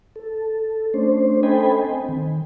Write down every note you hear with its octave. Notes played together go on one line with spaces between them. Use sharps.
A4
A3 C#4 D4 C5
A4 C5 D#5 G5 G#5 B5
C4
D#3